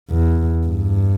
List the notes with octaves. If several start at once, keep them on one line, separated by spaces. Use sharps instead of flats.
E2
G2